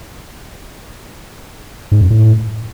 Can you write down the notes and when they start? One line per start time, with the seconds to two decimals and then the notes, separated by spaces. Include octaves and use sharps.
1.92 G#2
2.01 F#2
2.11 A2